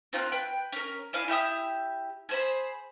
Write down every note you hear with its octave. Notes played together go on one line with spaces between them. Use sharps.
C4 F4 A#4 F#6
B4 G5
C#4 A#4
E4 D5 F5 G#5
E4 G4 E5 D#6
G#4 C5 B5